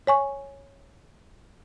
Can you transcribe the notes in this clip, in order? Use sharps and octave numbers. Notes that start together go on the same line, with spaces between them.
C#5 G#5 C#6